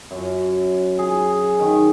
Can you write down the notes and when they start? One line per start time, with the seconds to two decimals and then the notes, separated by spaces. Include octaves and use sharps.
0.11 F#2
0.99 G#4
1.60 D#3